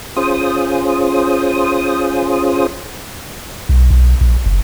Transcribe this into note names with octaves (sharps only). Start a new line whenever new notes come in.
C#4 F4 G#4 C5 D#6
B1
B1
A#1
F#1